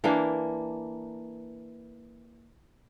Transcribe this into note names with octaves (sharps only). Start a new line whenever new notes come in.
E3 A#3 D4